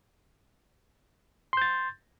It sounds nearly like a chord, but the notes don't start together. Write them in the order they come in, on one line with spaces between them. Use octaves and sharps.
C6 G6 A6